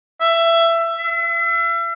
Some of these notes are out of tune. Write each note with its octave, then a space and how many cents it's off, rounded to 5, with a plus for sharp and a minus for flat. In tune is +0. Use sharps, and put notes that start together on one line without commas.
E5 +20
E5 +40